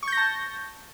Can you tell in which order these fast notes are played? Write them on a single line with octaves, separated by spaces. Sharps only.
C#6 G6 A#6 A5